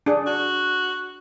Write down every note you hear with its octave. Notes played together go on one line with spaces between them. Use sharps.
D4 G#4
F#4